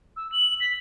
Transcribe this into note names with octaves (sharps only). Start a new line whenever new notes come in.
E6
F#7
B6